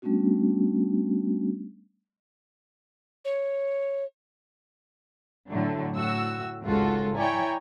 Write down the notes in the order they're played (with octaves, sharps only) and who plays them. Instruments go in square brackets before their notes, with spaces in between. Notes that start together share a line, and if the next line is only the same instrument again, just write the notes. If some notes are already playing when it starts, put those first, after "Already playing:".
[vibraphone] G3 A3 B3 C#4 D4 F#4
[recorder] C#5
[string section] A2 D3 F#3 A3
A2 F#4 E6
G#1 C#2 G#2 F4 F#4 A4
E4 C#5 D5 G5 G#5 A#5